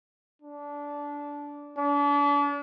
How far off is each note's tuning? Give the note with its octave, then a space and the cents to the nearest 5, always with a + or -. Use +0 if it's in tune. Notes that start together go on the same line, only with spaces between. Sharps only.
D4 -20
D4 -40